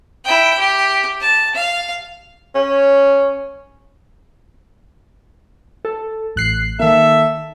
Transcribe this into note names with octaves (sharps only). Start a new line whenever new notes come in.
E4 G5
G4
A5
F5
C#4
A4
A1 F#6 C7
D#3 A#3 A4 E5